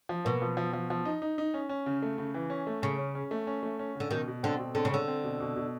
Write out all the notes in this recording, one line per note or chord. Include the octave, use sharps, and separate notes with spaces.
F3
B2 A#3
F3
F3
F3
F3
D#4
D#4
D#4
C#4
C#4
C#3
A3
C#3
E3
C#4
A3
C#3 C#4
C#4
C#4
A3
C#4
A3
C#4
C#3
D3
B2 D#3
B2
D3 C4
B2
D3 C4
C#3
D3 C4
C4
B2
B2
B2